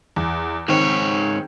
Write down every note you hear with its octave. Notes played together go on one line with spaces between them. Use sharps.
E2
G#2 D#3 C4 C#5